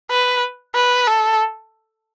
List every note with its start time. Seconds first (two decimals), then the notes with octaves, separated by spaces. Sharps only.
0.11 B4
0.75 B4
1.07 A4